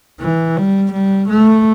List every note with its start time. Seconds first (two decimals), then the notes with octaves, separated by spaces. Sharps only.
0.21 E3
0.57 G3
0.93 G3
1.30 A3